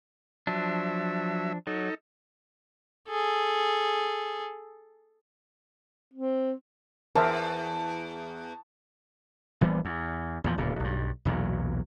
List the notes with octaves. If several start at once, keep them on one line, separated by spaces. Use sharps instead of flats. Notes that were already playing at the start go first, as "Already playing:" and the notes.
F3 F#3 D4 E5
F#3 D#4 A4
G#4 A4
C4
E2 A#4 C5 E5 A5
A#1 E3 G3 B3
E2
E2 A#2 F3
D1 C#2 A#2
B1 G2
B1 E2 A#2 F#3